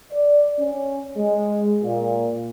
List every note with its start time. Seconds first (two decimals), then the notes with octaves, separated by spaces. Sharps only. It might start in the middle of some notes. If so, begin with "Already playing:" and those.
0.13 D5
0.60 C#4
1.17 G#3
1.83 A#2